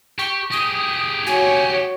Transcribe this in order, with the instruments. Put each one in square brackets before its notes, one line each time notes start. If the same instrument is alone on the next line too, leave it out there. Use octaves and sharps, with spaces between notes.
[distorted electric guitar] G4 [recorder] C#6
[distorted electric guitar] G4 G#4 [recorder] D#6
[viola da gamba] F#4 C#5 [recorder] G#5